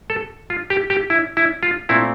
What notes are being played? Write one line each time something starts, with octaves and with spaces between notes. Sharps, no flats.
A4
F4
G4
G4
E4
E4
F4
A#2 A3 C4 E4